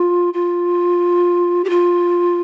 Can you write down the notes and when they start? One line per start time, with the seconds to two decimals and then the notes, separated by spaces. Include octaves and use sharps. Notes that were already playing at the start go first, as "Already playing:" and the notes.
Already playing: F4
0.34 F4
1.64 G4
1.70 F4